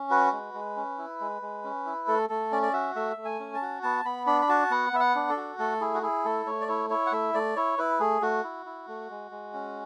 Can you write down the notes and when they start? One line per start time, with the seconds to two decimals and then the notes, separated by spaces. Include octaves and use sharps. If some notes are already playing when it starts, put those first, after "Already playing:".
Already playing: C#4
0.10 F#4 B4
0.32 G#3
0.54 G#3
0.76 C#4
0.98 E4
1.21 G#3
1.42 G#3
1.64 C#4
1.86 E4
2.08 A3 A4
2.29 A3 A4
2.52 C#4 D5
2.62 D5
2.73 F#4 E5
2.96 A3 E5
3.17 A3
3.25 G#5
3.40 C#4
3.54 A5
3.62 F#4
3.83 B3 A5
4.05 B3 B5
4.27 D4 B5
4.42 B5
4.49 F#4 A5
4.71 B3 F#5
4.93 B3 E5
5.00 F#5
5.15 D4
5.29 A4
5.37 F#4
5.59 A3 A4
5.81 E4 G#4
5.95 F#4
6.02 E4 G#4
6.25 A3 A4
6.46 A3 C#5
6.61 D5
6.68 E4 C#5
6.90 E4 C#5
7.06 F#5
7.12 A3 E5
7.34 A3 D5
7.56 E4 C#5
7.78 E4 B4
8.00 A3 G#4
8.22 A3 F#4
8.44 E4
8.66 E4
8.88 A3
9.10 G#3
9.31 G#3
9.53 C#4